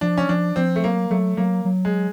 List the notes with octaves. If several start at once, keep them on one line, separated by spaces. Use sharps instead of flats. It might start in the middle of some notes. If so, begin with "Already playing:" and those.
F3 D4
C#4
F3 D4
F3 C4
A3
F#3 A#3
F#3 A3
F#3 A#3
F#3
G#3